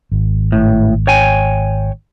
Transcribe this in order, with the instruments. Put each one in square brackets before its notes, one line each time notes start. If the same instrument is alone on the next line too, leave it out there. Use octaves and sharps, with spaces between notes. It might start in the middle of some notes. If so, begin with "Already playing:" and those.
[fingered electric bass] G#1
[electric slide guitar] A2
C#5 G5 G#5